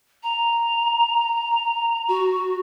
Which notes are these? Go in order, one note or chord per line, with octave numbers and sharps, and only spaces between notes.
A#5
F#4